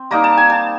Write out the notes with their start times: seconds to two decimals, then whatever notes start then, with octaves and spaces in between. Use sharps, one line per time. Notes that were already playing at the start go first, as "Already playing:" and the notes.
Already playing: C4
0.11 G3 A#3 D#4 A#5
0.24 A5
0.37 G#5
0.50 A5